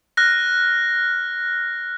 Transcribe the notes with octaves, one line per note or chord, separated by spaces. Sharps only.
F6 F#6 A#6